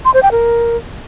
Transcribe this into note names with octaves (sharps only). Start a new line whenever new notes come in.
C6
C5
G5
A#4